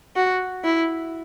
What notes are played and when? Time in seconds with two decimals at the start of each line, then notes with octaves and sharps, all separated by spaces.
0.16 F#4
0.64 E4